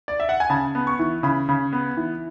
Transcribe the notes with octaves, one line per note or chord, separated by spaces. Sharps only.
D5
E5
F#5
G#5
C#3 A5
B3
C#6
E3
C#3 B5
C#3
B3
E3